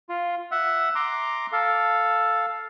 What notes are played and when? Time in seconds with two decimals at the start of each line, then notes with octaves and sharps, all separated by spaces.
0.09 F4
0.51 E5 F#5
0.95 A#5 C6 D6
1.52 A4 F5